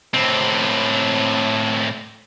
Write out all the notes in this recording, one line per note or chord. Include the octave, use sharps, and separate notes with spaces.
A2 C4